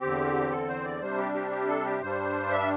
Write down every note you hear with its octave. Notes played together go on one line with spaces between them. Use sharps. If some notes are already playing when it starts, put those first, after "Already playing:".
E2 D3 C4 G4
A4
C5
D5
C3 G3 D4 C5
G4
G4
G4
A4
G4
G2 G3 D4 C5
E5